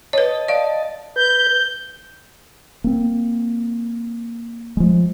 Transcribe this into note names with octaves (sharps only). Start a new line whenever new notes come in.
B4 C#5 D#5 A5
D5 F5
B4 G6
A#3 C4
F3 G#3